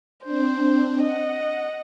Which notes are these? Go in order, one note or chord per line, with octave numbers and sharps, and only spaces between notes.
C4 D4 C5
D#5 F#5